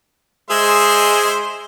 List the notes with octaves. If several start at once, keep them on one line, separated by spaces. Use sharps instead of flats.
G#3 G#4 C5 E5 C6